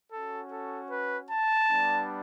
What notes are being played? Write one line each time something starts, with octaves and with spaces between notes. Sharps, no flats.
C#4 F#4 A4
A4
B4
A5
G3 B3 D4